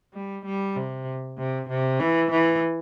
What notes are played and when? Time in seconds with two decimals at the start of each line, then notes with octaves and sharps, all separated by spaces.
0.14 G3
0.45 G3
0.76 C3
1.38 C3
1.69 C3
2.00 E3
2.31 E3